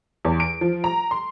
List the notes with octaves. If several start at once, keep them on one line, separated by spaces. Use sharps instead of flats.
E2
D7
F3
A#5
C6